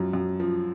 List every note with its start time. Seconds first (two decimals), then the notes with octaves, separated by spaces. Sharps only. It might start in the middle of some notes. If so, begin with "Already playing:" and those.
Already playing: F#2 F3
0.13 F#2
0.40 F3